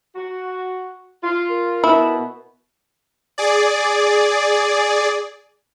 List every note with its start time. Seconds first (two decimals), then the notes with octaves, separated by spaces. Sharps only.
0.16 F#4
1.24 F4
1.49 A#4
1.84 B2 B3 E4
3.38 G#4 D5